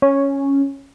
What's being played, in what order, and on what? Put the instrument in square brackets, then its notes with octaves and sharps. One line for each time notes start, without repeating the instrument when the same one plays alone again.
[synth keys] C#4